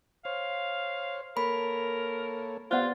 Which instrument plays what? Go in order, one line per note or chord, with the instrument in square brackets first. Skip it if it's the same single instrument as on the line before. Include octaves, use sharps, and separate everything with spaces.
[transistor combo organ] C5 C#5 [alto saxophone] F5
[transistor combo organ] A#3 A4 C#5 [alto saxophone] A#4 [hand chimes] B5
[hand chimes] B3 A6 [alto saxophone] F4 [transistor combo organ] G4 [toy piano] C5 D5 F#5